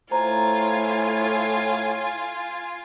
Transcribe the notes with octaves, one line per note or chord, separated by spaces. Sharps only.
A2 F4 C5 G#5 A#5